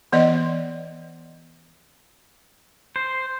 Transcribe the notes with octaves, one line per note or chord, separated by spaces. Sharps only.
E3 B3 D5 D#5
C5